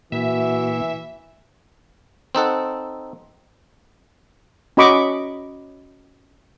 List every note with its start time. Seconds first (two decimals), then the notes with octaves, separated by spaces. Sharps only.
0.12 A#2 E3 A#3 F#4 E5
2.35 C4 D#4 A4 F#5
4.77 C#4 F#4 D#5 B5 C#6 D6